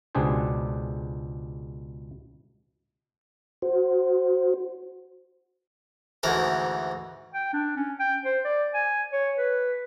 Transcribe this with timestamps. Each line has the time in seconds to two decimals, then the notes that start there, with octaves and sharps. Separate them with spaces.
0.15 C#2 B2 D4 G4 G#4 C5
3.62 F#4 C5
6.23 D2 G#2 E3 A#4
7.34 G5
7.53 D4
7.77 C#4
8.00 G5
8.25 C5
8.45 D5
8.74 G#5
9.13 C#5
9.38 B4